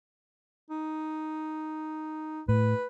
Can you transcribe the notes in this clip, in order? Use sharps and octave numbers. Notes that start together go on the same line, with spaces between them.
D#4
A2 B4